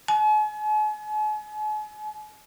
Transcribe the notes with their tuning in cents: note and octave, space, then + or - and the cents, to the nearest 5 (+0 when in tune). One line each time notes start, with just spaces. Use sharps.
G#5 +45